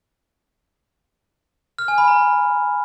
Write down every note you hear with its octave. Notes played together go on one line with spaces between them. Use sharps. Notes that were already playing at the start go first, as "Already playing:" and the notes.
F6
G#5
B5
A#5